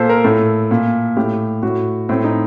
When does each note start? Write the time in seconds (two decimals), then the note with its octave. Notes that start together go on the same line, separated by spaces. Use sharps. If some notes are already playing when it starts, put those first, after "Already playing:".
Already playing: A#2 A4 C5
0.09 A#4
0.24 A2 A4
0.71 A#2
1.17 A2 G4
1.63 A2 F#4
2.09 A2 C4
2.24 D#4